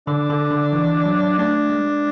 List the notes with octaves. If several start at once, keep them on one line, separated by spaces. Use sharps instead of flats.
D3 D4
D3
D3
E3
F#3
A3 D4
G#3